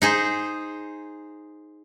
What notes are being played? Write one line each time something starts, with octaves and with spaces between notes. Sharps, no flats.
D#4 G#4 C5